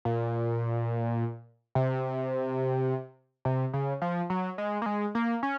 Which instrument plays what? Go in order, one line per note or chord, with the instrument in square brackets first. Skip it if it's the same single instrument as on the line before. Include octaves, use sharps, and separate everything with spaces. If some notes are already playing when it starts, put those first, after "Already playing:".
[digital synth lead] A#2
C3
C3
C#3
F3
F#3
G#3
A#3
G#3
A#3
C#4